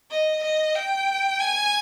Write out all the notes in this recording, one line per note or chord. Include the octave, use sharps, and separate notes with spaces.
D#5
D#5
G5
G#5